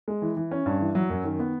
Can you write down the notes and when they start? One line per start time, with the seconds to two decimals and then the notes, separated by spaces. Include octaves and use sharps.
0.08 G#3
0.22 E3
0.37 E3
0.51 C#4
0.66 G2
0.80 E3
0.95 F#3
1.09 F#2
1.24 D#3
1.39 B3